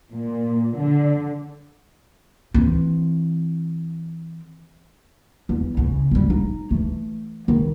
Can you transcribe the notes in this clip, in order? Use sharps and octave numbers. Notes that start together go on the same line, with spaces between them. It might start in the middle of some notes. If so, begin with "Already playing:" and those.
A#2
D3
E3 C4
E2
C#3 E3
D2 G3
D#4
E3 A3
D#3